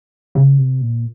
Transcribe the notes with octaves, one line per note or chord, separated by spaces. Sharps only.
C#3
C3
A#2